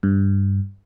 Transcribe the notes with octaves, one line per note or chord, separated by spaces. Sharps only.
G2